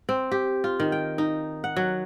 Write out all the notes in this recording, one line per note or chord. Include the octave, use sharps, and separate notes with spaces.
C4
G4
F4
D#3
G5
D#4
F#5
F#3